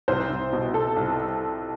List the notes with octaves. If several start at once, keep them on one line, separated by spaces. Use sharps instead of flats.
C2 C5
C2
B2
B2 A4
C2